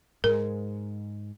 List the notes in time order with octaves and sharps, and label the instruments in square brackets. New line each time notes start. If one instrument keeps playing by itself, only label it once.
[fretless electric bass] G#2 G#3 [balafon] A#4